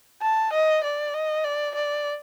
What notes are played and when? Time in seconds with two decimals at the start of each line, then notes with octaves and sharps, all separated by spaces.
0.22 A5
0.53 D#5
0.84 D5
1.14 D#5
1.45 D5
1.75 D5